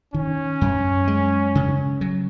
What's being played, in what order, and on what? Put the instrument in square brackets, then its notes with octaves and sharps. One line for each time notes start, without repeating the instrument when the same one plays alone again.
[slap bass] D#3 [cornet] C#4
[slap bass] F#2
G#3
C#3
F#3